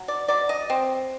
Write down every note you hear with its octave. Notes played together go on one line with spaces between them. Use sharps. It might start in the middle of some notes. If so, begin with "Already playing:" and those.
Already playing: F#3
D5
F#3 D5
D#5
C4